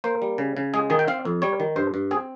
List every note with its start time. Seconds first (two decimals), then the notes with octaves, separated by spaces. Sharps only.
0.04 A#3 C5
0.22 G3
0.38 C#3
0.57 C#3
0.74 G#3 G#4
0.90 D#3 G#4
0.99 G5
1.08 C4 F5
1.25 F2
1.42 G3 C#5
1.60 D#3
1.76 G2 C5
1.94 G2
2.11 C4 G#4